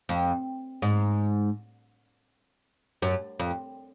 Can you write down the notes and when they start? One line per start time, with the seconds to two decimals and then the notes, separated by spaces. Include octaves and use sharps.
0.09 F2
0.82 G#2
3.02 F#2
3.40 F2